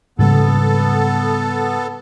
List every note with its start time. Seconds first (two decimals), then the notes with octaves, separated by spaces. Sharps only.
0.19 G#2 C#3 G3 B3 A4